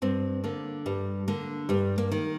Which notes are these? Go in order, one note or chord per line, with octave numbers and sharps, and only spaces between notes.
G2 C4
D3 A#3
G2 G3
D3 A#3
G2 G3
A#3
D#3